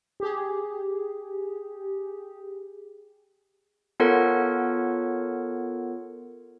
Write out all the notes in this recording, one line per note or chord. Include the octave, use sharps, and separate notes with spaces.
G4 G#4
B3 F4 A4 A#4 C#5 F#5